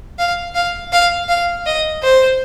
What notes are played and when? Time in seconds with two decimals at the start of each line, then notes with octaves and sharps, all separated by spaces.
0.19 F5
0.55 F5
0.92 F5
1.29 F5
1.66 D#5
2.03 C5